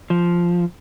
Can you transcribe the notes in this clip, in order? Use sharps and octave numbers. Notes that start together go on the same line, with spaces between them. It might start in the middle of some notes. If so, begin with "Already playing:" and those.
F3